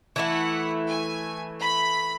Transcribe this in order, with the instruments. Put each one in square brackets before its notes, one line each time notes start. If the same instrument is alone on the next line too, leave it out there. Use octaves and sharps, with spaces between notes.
[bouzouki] E3 A3 E4 [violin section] F#5
[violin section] G#5
B5